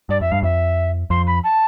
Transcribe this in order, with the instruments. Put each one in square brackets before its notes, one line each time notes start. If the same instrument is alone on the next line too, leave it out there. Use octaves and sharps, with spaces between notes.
[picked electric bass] G2 [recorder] D5
[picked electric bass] F2 [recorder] E5
[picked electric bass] G2 [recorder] F5
[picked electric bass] F2 [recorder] E5
[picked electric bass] F2 [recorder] C6
[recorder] B5
A5